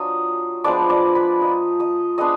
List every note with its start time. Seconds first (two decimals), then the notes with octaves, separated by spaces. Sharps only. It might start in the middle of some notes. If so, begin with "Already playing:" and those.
Already playing: F#3 D4 F4 D#5 D#6
0.64 F3 G#3 B3 D4 D5 D6
0.89 D5 D6
1.15 B4 B5
1.41 A#3 F4 D#5 D#6
1.80 D#5 D#6
2.18 G#3 B3 D4 D#5 D#6